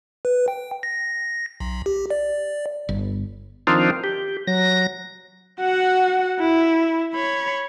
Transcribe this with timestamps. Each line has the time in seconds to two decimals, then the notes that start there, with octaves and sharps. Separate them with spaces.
0.25 B4
0.48 G5
0.83 A#6
1.60 B1
1.86 G4
2.10 D5
2.89 G1
3.67 D#3 F3 C4 D4 D#4 F4
4.04 G4
4.47 F#3 A#6
5.60 F#4 F#5
6.39 E4
7.14 C#5 B5